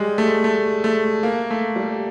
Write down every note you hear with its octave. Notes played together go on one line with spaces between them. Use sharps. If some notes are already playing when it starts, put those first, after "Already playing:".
Already playing: G3 G#3
A3
A3
A3
A#3
A3
G3